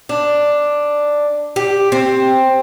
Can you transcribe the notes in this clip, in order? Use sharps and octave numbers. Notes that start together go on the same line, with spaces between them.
D4
G4
C4